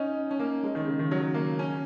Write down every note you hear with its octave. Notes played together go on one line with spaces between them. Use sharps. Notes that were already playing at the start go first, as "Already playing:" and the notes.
Already playing: C#4 D#4
C#4
A#3
G#3
D#3
C#3
D#3
F#3
A#3
C#4